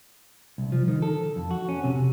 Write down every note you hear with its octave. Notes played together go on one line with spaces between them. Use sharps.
C2
F3
D#3
A4
F2
F#4
C#4
C3